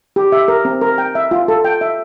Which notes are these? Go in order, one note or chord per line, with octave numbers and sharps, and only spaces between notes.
G4
E5
A#4
C4
A#4
G5
E5
F4
A4
G5
E5